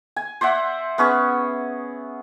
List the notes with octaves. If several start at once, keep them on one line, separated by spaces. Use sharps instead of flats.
G#5
C5 D5 E5 F#5
B3 C#4 G#4 C#6